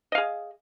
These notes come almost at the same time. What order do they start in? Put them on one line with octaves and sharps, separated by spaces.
D#5 F5 G#4